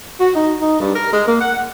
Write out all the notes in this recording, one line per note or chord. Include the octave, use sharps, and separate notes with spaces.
F#4
D#4
D#4
G2
A#4
G#3
A#3
F#5